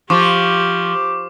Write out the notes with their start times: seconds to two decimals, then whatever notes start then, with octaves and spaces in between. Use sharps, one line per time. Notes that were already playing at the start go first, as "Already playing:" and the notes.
0.10 F3 G4 C#6 D6